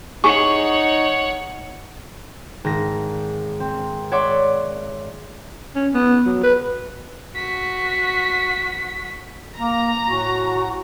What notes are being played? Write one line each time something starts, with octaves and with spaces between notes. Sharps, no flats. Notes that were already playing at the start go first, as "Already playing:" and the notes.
D#4 G#4 C#5 F#5 C#6
G#1 A#6
C4
C#5 D5 E5 F#5 C6 D6
C#4
B3
F#3
B4
F#4 B6
A#3 A#5
A2 F#4 G#5 C#6